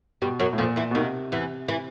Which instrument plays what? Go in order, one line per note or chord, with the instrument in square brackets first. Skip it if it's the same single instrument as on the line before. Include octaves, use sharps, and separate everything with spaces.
[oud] G2 G3 [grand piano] B2
[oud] F#2 F#3
[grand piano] A2
[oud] F2 F3 [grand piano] A#2
[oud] E2 E3
[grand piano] B2
[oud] D#2 D#3 [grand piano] C3
[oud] E2 E3
E3